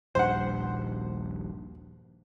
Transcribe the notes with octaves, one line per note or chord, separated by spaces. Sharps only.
D#1 A#1 G2 C5 F#5